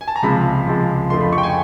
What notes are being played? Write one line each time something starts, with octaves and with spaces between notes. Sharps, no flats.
G#5
A5
A#5
C#2 C3 F3 G#3 B5
C#2 C3 F3 G#3
F2 D3 F3 A3 C6
B5
C#6
G5
G#5